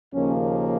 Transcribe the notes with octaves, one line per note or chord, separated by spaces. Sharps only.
D#2 C#3 F3 A#3 C#4